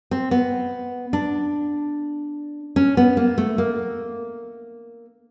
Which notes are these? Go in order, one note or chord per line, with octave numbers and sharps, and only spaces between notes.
C4
B3
D4
C#4
B3
A#3
A3
A#3